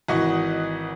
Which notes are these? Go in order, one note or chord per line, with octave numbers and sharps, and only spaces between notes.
G#1 E3 F#4 D#5 F#5 C#6